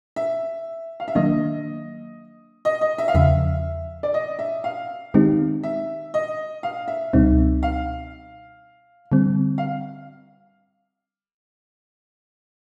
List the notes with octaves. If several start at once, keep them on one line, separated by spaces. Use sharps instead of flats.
E5
F5
E5
D#3 F#3 A#3 D4 D#5
D#5
D#5
E5
F5
E2 C#3 F3 E5
D5
D#5
E5
F5
D#3 G#3 C4 D#4 G4
E5
D#5
F5
E5
C#2 B2 G3 C4 D#4
F5
D3 G3 C4
F5